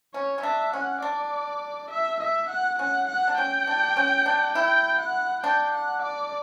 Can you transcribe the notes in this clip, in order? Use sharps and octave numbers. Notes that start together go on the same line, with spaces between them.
C#4 C#5
C#4
D4 E5
C#4 F#5
D4 D5
E5
E5
F#5
C#4 F#5
F#5
D4
C#4 G5
D4
C#4
D4
E4 G5
F#5
D4 G5
F#5
D5